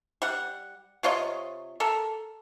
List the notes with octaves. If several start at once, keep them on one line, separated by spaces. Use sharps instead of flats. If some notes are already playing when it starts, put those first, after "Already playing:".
G3 F#5
C3 F4 C#5 D#5
A4 A#4